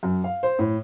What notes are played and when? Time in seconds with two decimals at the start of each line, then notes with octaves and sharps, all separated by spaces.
0.03 F#2
0.24 F5
0.43 C5
0.59 A2